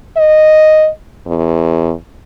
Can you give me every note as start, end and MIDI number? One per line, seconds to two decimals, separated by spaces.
0.17 0.89 75
1.26 1.93 40